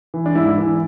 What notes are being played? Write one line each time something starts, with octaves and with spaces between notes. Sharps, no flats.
E3
D4
G#2 E4
E3